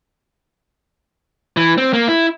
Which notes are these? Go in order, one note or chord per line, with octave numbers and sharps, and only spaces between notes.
E3
C4
A#3
E4